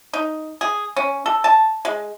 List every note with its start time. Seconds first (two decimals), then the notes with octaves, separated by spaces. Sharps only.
0.13 D#4
0.61 G#4
0.96 C#4
1.26 A4
1.44 A5
1.85 G#3